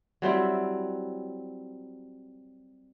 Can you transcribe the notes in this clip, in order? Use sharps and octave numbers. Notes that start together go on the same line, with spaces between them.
F#3 G3 C4 E4